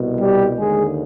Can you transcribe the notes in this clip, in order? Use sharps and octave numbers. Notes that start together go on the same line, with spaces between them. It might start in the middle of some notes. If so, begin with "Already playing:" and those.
Already playing: C2 B2
G3 G4
D#2 D3 G#3 G#4